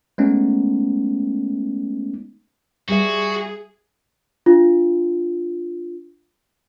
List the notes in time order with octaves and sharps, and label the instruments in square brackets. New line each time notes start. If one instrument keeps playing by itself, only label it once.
[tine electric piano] G#3 A3 B3 C#4 D#4
[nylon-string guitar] G3 E5 [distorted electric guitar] F#4 [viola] G#4
[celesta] D4 F4